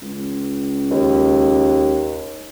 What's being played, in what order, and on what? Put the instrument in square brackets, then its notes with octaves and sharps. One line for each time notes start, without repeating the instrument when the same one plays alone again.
[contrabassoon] C#2
[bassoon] D#2